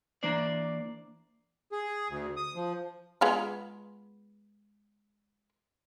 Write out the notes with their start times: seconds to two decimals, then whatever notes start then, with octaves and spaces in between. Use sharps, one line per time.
0.23 E3 A#3 D4 C5 D5
1.72 G#4
2.09 D2
2.37 D#6
2.55 F3
3.21 G#3 B3 F4